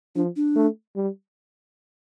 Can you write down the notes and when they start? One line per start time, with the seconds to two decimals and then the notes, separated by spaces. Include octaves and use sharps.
0.16 F3 D4
0.36 D4
0.56 A3
0.96 G3